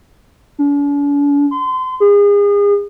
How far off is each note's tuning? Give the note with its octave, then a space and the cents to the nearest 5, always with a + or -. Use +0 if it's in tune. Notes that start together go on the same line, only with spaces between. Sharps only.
D4 -45
C6 -30
G#4 -35